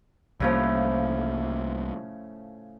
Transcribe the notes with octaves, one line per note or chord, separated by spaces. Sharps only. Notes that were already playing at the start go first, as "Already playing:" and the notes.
C2 A2 C#3 F3 G3 A#3